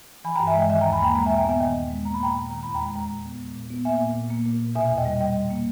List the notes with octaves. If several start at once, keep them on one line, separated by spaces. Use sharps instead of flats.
E3 G#5 B5
G5 A#5
G2
E5 G#5
G#3 D#5 G5
D#3 E5 G#5
G5 A#5
D#2
G#5 B5
A#3 G5 A#5
G#3 G5 A#5
E5 G#5
A#2
G5 A#5
B3 E5 G#5
D#3 D#5 G5
D#2
G#3
A#3 A#5
B5
A#2 G5 A#5
A#2
D#3 A#5
E2 B5
G5 A#5
G#3
G#3 G5 A#5
A#2
B3
G#3
A#2
B3
A#3 E5 G#5
A#2
A#2
A#3
A#2
A#2
B2 E5 G#5
E2
D#5 G5
G3
G3 D#5 G5
G#2
A#3